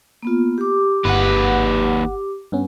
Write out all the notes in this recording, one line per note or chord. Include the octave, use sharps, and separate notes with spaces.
A#3 B3 F4
G4 D6
G1 D#2 B4 F#5
G2 B3 C#4